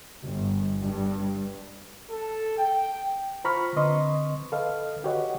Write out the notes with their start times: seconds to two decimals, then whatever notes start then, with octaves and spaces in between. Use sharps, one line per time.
0.22 G1
0.82 G2
2.09 A4
2.58 G5
3.44 F4 C5 A#5 B5 C#6 F6
3.76 D3 C4 B4 D#5 C6 C#6
4.52 A4 B4 D#5 F5
5.04 F#4 G4 B4 C#5 D#5 F#5